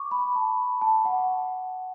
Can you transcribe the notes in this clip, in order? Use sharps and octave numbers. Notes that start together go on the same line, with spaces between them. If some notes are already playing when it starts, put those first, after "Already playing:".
Already playing: C#6 D6
B5
A5
A5
F#5